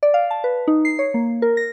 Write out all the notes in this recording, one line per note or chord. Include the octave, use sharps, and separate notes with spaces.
D5
F5
A5
B4
D#4
C7
C#5
A#3
A#4
A#6